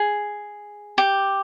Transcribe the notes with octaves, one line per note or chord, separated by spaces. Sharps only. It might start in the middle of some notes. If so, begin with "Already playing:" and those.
Already playing: G#4
G4